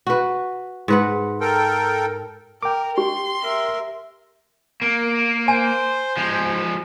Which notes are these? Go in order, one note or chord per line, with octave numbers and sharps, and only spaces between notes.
F#4 B4
G#2 B4 F#5
A4 A#4 G5
A#4 G5 D6
G4 C6
A#4 E5
A#3
C5 G#5
F3 G#3